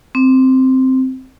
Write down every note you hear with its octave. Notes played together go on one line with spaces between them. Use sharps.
C4